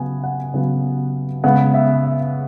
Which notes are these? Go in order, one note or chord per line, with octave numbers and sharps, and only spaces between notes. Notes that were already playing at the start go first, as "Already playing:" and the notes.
Already playing: C#3 F#3 B3 G#5
F#5
C#3 F#3 B3
C#3 G#3 B3 F#5
E5
E5